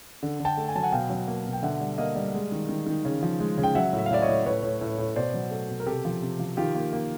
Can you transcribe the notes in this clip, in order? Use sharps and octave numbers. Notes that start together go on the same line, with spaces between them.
D3
D3
G5 A5
A3
G#5
F#3 A5
F#5 G#5
B2 F5 G5
F#3
A#3
B2
G5
D3 E5 F#5
G3
A#3 D#5 F5
G3
G#3
D#3
D#3
D#3
C#3
F3
G#3
C#3
G5
F#3 E5 F#5
A2
E5
F5
A2 D5 E5
C#5 D#5
A2
A2 B4 C#5
A2
A2
A2
B2 C5 D5
F#3
A3
B2
A#4
C3 G4 A4
F3
C3
F3
D#3 F4 G4
A#3
A#3